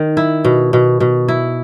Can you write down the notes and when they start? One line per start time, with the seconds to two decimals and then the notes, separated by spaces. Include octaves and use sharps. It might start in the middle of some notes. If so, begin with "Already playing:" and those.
Already playing: D#3
0.17 E4
0.45 B2
0.73 B2
1.00 B2
1.28 E4